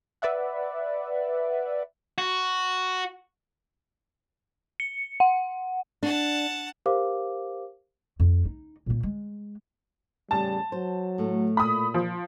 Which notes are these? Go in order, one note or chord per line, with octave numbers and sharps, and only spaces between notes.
B4 D5 E5 F#5
F#4
C#7
F#5
D4 F#5 A5
G4 A#4 C5 F5 D6
F2
D#4
A#2 A#3
G#3
E2 A2 C#3 G3 A5
F#3 C5
A2 A3
A#2 B5 D#6
F3